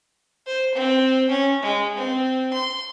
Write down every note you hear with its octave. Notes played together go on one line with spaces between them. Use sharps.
C5
C4
C#4
G#3
C4
C6